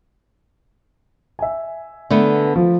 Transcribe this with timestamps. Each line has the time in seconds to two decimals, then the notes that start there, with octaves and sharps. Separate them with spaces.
1.39 E5 G#5
2.10 D3 A3 B3
2.56 F3